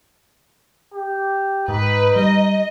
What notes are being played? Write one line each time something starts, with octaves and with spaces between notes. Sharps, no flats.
G4
G#2 D#4 B4
G3 D#5